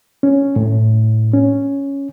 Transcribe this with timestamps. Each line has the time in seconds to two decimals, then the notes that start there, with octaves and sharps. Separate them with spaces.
0.23 C#4
0.56 A2
1.33 C#4